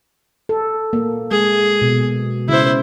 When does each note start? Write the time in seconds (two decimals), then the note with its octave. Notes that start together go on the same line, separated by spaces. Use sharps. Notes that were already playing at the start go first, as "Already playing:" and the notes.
0.49 A4
0.93 A#3
1.31 G#3 G#4
1.82 B2
2.49 C#3 E4 C5